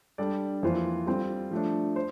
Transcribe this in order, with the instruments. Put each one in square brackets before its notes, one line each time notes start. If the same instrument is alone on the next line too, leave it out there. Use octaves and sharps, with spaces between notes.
[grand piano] G3 D4 A4 D5
F2 E3 A#3 F4 C5
G3 C4 F4 A4
F3 A3 D4
C5